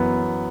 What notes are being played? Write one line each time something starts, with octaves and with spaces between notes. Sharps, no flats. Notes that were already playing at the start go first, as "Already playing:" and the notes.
Already playing: F#2 E3 B3